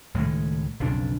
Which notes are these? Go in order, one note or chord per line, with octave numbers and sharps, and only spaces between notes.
C#2 A2 D#3 G#3
B1 F2 C#3 D4